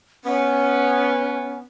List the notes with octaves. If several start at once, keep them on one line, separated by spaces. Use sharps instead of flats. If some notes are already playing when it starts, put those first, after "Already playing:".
B3 C#4